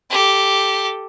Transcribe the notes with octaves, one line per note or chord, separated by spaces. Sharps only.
G4 A4